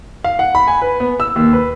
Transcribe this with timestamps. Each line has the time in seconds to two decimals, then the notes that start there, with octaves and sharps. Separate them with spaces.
0.24 F5
0.39 F#5
0.55 B5
0.68 G#5
0.82 B4
1.00 B3
1.20 E6
1.36 D#2
1.53 B4